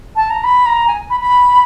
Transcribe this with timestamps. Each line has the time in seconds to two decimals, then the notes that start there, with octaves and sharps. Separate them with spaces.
0.16 A5
0.30 A#5
0.44 B5
0.66 A#5
0.88 G#5
1.10 B5
1.20 B5